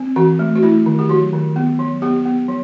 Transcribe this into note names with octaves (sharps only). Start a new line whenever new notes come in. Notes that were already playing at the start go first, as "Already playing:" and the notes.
Already playing: C4
E3 F#4
A3
F#4
A3 E4
D#3
G4
F#3 F#4
D#3
B3
F#3
B3 G4
B3
F#3